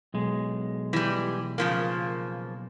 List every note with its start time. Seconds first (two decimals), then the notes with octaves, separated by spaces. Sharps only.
0.14 B1 G#3
0.93 E3 G3
1.58 C#3 F3 A#3